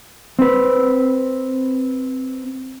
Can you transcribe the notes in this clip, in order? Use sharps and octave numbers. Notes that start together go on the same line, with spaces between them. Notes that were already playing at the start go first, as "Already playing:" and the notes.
C4 B4